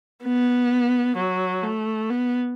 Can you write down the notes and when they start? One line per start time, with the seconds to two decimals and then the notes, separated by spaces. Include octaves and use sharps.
0.24 B3
1.17 F#3
1.63 A3
2.10 B3